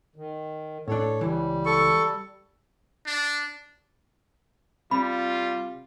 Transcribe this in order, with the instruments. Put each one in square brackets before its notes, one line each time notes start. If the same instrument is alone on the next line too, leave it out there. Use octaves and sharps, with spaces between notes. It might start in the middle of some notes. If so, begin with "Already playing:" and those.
[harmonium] D#3
[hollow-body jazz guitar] A2 D4 [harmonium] A4 C#5
[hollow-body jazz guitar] C#2 E3 [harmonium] G3
[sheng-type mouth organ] A4 C#6
[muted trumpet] D4
[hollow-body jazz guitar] C3 [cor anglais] G3 [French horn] F4 [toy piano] B5